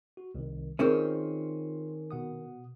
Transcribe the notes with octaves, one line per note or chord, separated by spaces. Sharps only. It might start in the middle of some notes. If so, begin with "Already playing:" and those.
F#4
C2 D#3
D#3 C4 C#4 F4 G#4 A#4 C6
B2 F#5 D#6